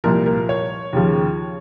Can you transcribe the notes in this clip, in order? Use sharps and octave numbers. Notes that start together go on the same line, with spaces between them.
C2 A#2 F3 A#4
A#4
C#5
D#2 C#3 F3